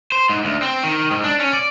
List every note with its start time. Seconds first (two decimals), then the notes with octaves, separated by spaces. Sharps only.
0.12 C5
0.29 G#2
0.45 D2
0.62 C4
0.84 D#3
1.11 G#2
1.24 D4
1.40 C#4
1.53 D5